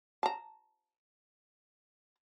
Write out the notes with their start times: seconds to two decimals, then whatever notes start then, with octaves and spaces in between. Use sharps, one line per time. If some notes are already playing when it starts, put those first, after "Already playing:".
0.23 A5 A#5